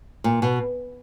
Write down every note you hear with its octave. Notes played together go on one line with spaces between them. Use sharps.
A#2
B2